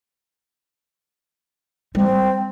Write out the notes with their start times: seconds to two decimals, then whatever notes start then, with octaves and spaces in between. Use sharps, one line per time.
1.95 G3 C4